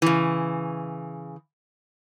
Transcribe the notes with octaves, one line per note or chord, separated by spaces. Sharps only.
C#3 E3